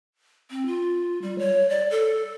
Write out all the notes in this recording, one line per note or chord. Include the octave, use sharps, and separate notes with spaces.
C4
F4
G3
C#5
D5
A4